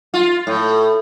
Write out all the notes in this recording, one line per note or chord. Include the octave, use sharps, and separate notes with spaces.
F4
A2